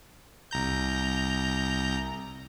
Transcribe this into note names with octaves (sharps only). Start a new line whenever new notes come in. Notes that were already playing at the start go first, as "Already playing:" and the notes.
C2 A#5 G6